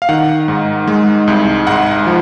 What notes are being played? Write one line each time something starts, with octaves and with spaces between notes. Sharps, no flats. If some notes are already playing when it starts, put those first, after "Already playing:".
F5
D#3 F#5
G#2
G#3
C2
G#2 F#5
F3